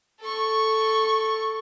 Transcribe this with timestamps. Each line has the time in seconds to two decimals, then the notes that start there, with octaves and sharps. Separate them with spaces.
0.21 A4 C#6